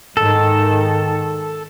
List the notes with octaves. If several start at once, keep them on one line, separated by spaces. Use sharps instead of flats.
G#2 D#3 A4